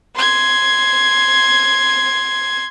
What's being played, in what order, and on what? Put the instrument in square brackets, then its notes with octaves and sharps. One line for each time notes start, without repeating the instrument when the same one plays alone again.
[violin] C6 G#6